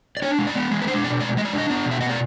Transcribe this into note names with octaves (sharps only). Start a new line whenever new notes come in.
D5
D4 C#5
G#3
D5
B3
G#3
B4
D4 C5
B2 D5
G#3 D5
G#3 D#5
D5
D4
D#5
B3 D5
B2
E5
B3 D#5
D5